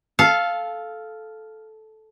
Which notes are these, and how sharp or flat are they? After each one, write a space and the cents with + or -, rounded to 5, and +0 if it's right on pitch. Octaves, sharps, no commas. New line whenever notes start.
A4 -10 F5 +0 A5 -30